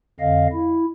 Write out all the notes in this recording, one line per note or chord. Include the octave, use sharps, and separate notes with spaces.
F2 D3 D#5 F5
E4